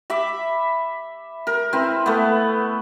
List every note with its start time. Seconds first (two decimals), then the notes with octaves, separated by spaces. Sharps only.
0.10 E5 B5 D6
1.47 A#4
1.73 C4 E4 B4
2.06 A3 B3